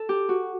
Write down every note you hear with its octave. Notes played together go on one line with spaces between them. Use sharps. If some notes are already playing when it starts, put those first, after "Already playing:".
Already playing: A4
G4
F#4